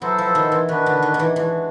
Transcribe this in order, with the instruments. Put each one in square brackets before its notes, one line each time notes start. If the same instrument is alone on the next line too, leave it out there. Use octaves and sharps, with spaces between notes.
[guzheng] F#3 [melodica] B3 E4 A4 C5
[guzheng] F3
D#3
E3
[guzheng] D#3 [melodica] B3 D4 F#4 B4
[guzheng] D3
D#3
D#3
E3
[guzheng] E3 [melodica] G#3 B3 D4 F#4